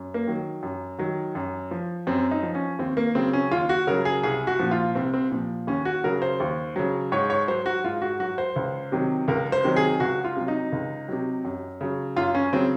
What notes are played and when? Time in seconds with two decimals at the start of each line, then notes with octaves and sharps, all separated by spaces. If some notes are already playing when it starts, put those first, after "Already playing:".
Already playing: F#2
0.14 A#3
0.27 D#3 F#3
0.63 F#2
0.99 D#3 F#3
1.35 F#2
1.71 F3
2.07 F#2 C4
2.31 D#4
2.43 F3
2.55 C#4
2.79 D#2 C4
2.97 A#3
3.15 C#3 F#3 C4
3.33 C#4
3.51 D#2 F4
3.69 F#4
3.87 C#3 F#3 A#4
4.05 G#4
4.23 C2 G#4
4.47 F#4
4.59 A#2 F3
4.71 F4
4.95 C2 C4
5.14 C4
5.31 A#2 F3
5.67 D#2 C#4
5.85 F#4
6.04 C#3 F#3 A#4
6.22 C5
6.40 D#2
6.76 C#3 F#3
7.12 G#2 C#5
7.30 C#5
7.48 F#3 C5
7.66 F#4
7.84 G#2 F4
8.02 F#4
8.20 F#3 F#4
8.38 C5
8.56 C#2
8.92 C3 D#3 F#3
9.28 C#2 A#4
9.52 C5
9.64 C3 D#3 F#3
9.76 G#4
10.00 C#2 F#4
10.24 F4
10.36 C3 F#3
10.48 D#4
10.72 C#2
11.08 C3 F#3
11.45 F#2
11.81 C#3 F#3
12.16 F#2 F4
12.35 C#4
12.53 C#3 F#3 C4